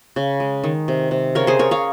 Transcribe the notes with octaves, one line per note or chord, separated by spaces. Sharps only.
C#3
G#3
D#3
C3
C3
C#3 A#4 C#5
G#4 C5
C#3 A#4 C#5
C#5 F5